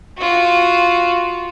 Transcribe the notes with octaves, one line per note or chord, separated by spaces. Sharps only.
F4 F#4